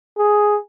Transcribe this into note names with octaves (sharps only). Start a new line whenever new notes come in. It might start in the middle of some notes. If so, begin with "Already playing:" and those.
G#4